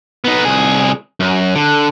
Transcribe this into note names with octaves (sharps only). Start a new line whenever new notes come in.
B3 D#4
C2 G#4
F#2
D3